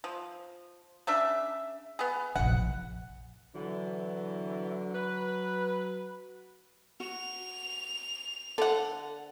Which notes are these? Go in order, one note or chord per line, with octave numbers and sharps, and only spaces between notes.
F3
C#3 D4 E5
B3 G#4
F1 A#1 F#5
D3 E3 F#3
B4
F#4 F7
D3 A4 F#5